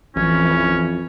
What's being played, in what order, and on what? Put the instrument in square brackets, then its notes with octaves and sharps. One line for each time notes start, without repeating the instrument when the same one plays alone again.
[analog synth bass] A1 [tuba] F2 [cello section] E3 [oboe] C#4